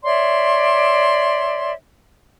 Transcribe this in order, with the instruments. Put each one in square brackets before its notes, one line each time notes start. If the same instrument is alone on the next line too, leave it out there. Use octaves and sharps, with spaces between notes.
[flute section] C#5 D5 E5 C6